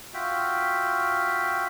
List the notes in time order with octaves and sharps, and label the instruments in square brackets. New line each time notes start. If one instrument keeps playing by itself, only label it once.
[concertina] F4 F#4 E5 G5